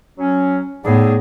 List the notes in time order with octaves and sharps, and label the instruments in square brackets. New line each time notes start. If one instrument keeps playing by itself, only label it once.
[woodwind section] F#3 C#4
[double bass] A2 B3 [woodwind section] D4 D#4 G#4